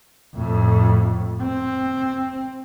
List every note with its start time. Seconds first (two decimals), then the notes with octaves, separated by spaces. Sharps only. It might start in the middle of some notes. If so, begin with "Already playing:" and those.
0.35 F2 A2
1.43 C4